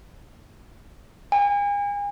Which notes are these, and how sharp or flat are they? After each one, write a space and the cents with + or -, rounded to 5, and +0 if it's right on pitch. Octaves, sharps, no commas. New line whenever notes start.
G#5 -40